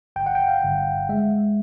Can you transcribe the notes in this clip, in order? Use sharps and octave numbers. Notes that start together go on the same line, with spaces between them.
G1 G5
F#5
G5
F5
G1
G#3 E5